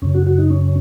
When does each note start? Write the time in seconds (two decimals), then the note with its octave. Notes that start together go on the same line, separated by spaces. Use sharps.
0.02 F#2 C#3 C#4
0.14 F#4
0.26 F#4
0.38 D#4
0.50 C#4